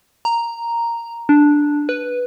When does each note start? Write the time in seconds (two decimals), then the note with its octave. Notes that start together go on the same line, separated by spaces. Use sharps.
0.25 A#5
1.29 D4
1.89 B4